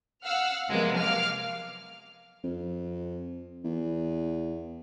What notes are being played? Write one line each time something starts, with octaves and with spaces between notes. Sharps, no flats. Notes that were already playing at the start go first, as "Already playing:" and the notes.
F5 F#5 E6 F6
C3 F3 F#3 G#3 A#3 B3
F5 D6 F6
F2
E2